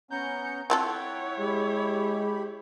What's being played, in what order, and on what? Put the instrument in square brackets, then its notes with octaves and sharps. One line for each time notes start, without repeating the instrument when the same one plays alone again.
[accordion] B3 C#4 A#5 [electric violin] G6 C#7
[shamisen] C4 F4 A4 [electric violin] E4 C#5 [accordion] F#5 G5
[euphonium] G#3 [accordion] G4 B5